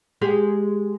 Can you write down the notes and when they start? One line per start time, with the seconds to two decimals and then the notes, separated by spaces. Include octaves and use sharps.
0.22 G#3 G4 G#4